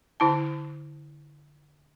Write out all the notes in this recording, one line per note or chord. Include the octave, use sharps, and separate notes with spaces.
D3 E4 A5